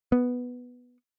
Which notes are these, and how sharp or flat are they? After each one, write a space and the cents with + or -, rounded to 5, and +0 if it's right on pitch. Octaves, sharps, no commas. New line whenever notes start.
B3 +0